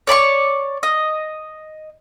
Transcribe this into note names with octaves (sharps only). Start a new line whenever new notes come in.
C#5 D5 B5 C#6
D#5